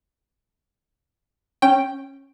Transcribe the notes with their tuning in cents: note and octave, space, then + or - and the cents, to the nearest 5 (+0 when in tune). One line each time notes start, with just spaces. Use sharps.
C#4 -15 G5 +0